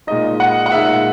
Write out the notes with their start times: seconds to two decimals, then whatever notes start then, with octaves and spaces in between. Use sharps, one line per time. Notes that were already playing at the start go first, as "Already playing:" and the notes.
0.07 A#2 G#3 D#4 D#5
0.40 F#5
0.66 F#5
0.72 A#2 G#3 D#4 E5